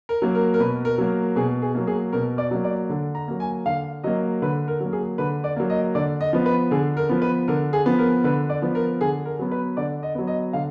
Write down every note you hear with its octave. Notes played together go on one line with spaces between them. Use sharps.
A#4
F#3 A#3
A#4
A#4
B2 B4
A#4
F#3 A#3
B2 G#4
G#4
F#3 A#3
G#4
B2 A#4
D5
F#3 A#3
D5
D3
A#5
F#3 A#3
G#5
D3 F5
F#3 A#3 D#5
D3 B4
A#4
F#3 A#3
G#4
D3 B4
D5
F#3 A#3
D#5
D3 D5
D#5
F3 B3
B4
D3 G#4
A#4
F3 B3
B4
D3 A#4
G#4
F3 B3
A#4
D3 B4
D5
F3 B3
A#4
D3 G#4
A#4
F#3 B3
B4
D3 D5
D#5
F#3 B3
D#5
D3 F5